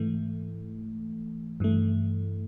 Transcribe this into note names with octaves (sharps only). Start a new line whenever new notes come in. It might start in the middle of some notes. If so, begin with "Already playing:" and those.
Already playing: G#2 E3 A3
G2 E3 A3